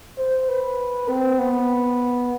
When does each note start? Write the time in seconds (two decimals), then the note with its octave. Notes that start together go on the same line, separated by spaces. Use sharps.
0.18 C5
0.49 B4
1.09 C4
1.39 B3